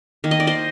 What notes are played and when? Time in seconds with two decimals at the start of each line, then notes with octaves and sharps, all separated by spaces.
0.24 D#3 A#3
0.31 D#5
0.40 D5
0.47 C5 D#5